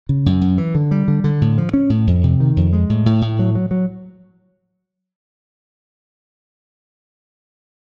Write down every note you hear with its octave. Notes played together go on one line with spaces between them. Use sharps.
C#3
F#2
F#2
E3
D3
G3
D3
D3
A2
F3
C#4
A2
F2
C3
D#3
F2
G#3
A2
A2
A2
F#3
F#3
F#3